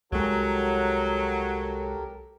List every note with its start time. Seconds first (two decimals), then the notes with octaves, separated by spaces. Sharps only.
0.12 C2 F#3 G#3 G4 A4 A#4